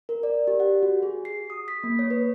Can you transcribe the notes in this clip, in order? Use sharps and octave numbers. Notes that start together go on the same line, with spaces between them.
A#4
D5
G4
F#5
F#4
G#4
C7
D#6
B6
A#3
C#5
B4